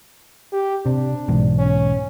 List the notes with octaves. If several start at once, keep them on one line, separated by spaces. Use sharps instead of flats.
G4
C3 D4
B1 E2 G#2
C#4